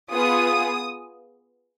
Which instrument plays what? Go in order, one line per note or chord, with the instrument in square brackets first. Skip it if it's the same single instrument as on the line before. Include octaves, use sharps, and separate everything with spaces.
[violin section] B3 F4 G#4 D#6